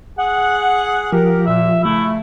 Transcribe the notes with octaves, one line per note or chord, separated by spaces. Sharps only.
G#4 F#5
F3 G4 A#4
A#2 E5
C#3 A3 E4